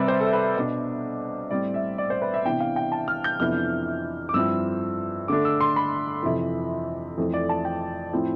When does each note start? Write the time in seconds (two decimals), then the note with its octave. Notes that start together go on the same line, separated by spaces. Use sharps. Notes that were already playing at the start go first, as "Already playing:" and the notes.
Already playing: C3 G3 C4 B4 D5 E5
0.08 C5
0.20 A4
0.33 B4
0.56 B2 B3 D4
1.51 A2 G3 C4 D5
1.74 E5
1.98 D5
2.10 C5
2.22 B4
2.34 E5
2.45 C3 E3 B3 D4 G5
2.60 F5
2.76 G5
2.92 A5
3.08 F6
3.24 G6
3.40 F2 C3 E3 B3 D4 F6
4.29 D6
4.34 G2 F3 C4 E4 E6
5.28 D3 A3 D4 D6
5.45 E6
5.61 C6
5.76 B5
6.23 F2 C3 E3
7.18 F2 E3 A3 C4
7.34 D5
7.49 A5
7.65 G5
8.13 A2 F3 C4 E4